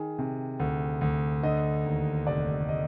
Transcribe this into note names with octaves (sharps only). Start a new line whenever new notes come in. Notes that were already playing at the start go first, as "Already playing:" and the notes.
Already playing: D#3 G#4
C3
D2
D2
D3 D#5
D#2
F1 D5
D#5